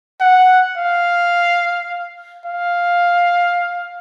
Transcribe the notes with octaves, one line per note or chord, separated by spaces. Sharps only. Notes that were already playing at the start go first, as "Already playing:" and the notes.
F#5
F5
F5